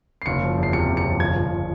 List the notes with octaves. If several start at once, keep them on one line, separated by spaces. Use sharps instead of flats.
C7
F#1 C#7
F3
E2
C7
C3 C#7
F#1
C#7
F3
G1 G#6
G1